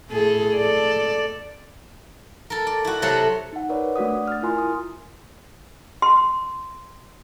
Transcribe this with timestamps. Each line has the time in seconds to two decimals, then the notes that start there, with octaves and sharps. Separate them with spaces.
0.11 A2 G#4 A4
0.57 A4 D5
2.50 A4 A#4
2.67 D5
2.84 E4 F#4
3.02 C3 F#3 A4 C5 E5 F#5
3.53 D#4 F#5
3.69 A#4 B4 C#5 D5
3.96 A3 D4 F#4 D5 F#5 D#6
4.28 F6 A6
4.43 E4 F4 A#4 G#5 C6
4.58 D#6
6.02 C6